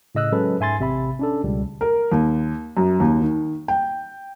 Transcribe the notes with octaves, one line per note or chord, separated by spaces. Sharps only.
A2 C#3 D#5 E6 F#6
F#3 G#3 C#4 A4 B4
G#2 E5 G#5 C6 A6
A1 C3 E5 B5
C#4 D4 A4
C#2 B2 G3
A#4
D#2
F#2
D#2
D#3
G5